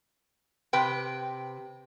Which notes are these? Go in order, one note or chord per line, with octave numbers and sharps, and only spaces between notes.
C3 B4 G5